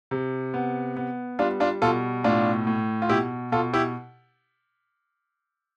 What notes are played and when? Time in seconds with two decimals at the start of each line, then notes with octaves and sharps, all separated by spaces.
0.11 C3
0.54 B3
0.97 B3
1.39 G3 D4 F4
1.60 D4 F4
1.82 B2 F4 A4
2.24 A2 D4 F4
2.67 A2
3.02 F4
3.09 B2 E4 G4
3.52 B2 F4 A4
3.73 E4 G4